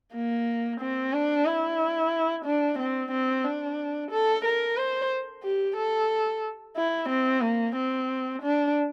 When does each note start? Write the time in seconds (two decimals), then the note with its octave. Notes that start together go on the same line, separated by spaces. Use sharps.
0.14 A#3
0.80 C4
1.13 D4
1.46 E4
2.45 D4
2.79 C4
3.12 C4
3.45 D4
4.11 A4
4.45 A#4
4.77 C5
5.44 G4
5.77 A4
6.77 E4
7.09 C4
7.42 A#3
7.76 C4
8.42 D4